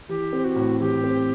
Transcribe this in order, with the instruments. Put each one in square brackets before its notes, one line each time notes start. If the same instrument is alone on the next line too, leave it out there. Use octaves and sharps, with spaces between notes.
[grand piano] E3 [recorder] G4
[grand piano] C4
[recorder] F#4
[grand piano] A2
[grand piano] E3 [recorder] G4
[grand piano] C4